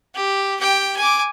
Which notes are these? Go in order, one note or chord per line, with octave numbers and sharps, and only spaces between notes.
G4
G4 G5
G#5 D6